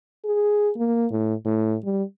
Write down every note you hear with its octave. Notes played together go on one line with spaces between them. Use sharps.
G#4
A#3
A2
A2
G3